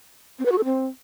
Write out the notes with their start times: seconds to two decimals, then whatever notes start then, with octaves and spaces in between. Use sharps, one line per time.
0.39 C4
0.45 B4
0.52 F#4
0.58 A4
0.64 C4